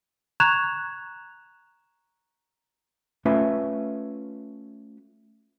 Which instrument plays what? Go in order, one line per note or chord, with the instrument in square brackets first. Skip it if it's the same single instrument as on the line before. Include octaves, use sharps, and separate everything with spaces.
[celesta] A#5 C#6 F#6 G#6 E7 F7
[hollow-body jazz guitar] A3 C#4 F4 B4 E5